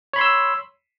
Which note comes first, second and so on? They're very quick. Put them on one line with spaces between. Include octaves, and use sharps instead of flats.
C#5 B5 C6 E6